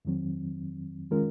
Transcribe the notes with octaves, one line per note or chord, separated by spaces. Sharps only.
F2 D#3 F#3 C4
D#3 G#3 C#4 F4 A#4